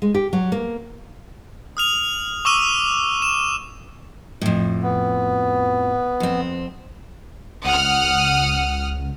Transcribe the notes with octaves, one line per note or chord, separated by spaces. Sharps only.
G#3
G4
F#3
A#3
D#6 F6 F7
C#6 D6 E6 D#7
E7
F2 A2
B3
F2 C4
C#2 F#5 D#6 F6